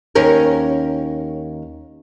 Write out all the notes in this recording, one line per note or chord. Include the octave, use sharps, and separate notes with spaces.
D#2 C#4 A#4